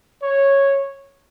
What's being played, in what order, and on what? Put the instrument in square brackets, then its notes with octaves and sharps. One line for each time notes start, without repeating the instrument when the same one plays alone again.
[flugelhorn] C#5